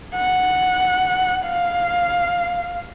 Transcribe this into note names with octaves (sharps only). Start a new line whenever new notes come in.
F#5
F5